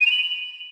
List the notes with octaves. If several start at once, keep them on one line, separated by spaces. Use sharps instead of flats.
D#7
F7
F#7